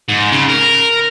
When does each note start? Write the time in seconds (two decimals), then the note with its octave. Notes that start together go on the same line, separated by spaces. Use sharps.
0.08 G#2
0.32 C#3
0.48 A#4